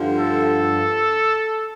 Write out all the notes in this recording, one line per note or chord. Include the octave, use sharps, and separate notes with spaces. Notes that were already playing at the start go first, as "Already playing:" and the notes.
Already playing: G2 D3 F3
A4